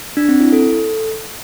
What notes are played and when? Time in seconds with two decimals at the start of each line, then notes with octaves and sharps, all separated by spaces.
0.17 D4
0.29 C4
0.41 E4
0.52 A4